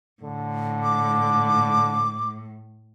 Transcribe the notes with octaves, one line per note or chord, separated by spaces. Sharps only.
A2 D3
D6